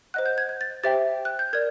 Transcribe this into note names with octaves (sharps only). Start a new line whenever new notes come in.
C5 D#5 F#5 F#6
G6
G#6
G#6
A6
G4 C5 E5 G5 A6
F#6
G6
A#4 D5 G#6